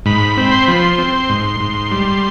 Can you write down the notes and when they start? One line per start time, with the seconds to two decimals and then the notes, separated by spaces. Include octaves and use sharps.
0.06 G#2 B5
0.37 C4
0.52 C6
0.66 F3 B5
0.79 C6
0.98 C4
1.29 G#2
1.60 G#2
1.91 G3